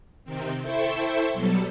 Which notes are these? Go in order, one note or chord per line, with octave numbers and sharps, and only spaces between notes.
C3 D#3 C4
E4 A4 C5 E5 G5 C#6
B2 F#3 G3 A4